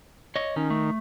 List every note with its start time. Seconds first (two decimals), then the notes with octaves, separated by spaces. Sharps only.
0.36 C#5 D#5
0.56 D#3 C#4
0.70 A3